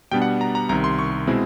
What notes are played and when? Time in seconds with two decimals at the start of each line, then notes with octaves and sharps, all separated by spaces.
0.12 B2 G3 B3 D4 G5
0.22 F#5
0.41 A#5
0.55 A#5
0.69 C2 C3 D#3 A#5
0.84 C6
0.99 C#6
1.27 B2 G#3 C4 E4